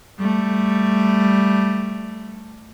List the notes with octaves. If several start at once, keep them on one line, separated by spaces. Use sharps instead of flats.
G3 A3